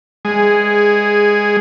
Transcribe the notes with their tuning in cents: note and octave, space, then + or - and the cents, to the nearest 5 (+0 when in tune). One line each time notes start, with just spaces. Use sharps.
G#3 -10 G#4 +0